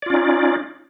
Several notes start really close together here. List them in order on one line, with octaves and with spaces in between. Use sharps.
D5 F4 C#4 D#4